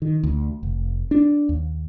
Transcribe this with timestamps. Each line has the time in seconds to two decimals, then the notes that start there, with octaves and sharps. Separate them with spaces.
0.02 D#3
0.23 D2
0.63 F1
1.11 D4
1.49 D#2